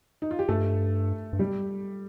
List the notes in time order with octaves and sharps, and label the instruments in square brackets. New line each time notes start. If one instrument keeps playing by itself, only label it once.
[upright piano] D#4
F4
G4
[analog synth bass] G2 [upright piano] A3 A4
[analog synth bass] G2
[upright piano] G3 G4